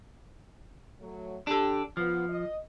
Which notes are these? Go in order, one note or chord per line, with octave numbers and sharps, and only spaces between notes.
F#3 A3
D4 G4 A4
F3 B3 F4
D#5